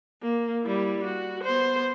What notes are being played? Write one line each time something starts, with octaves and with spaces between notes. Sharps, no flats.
A#3
G3 E4
F#4
B3 C5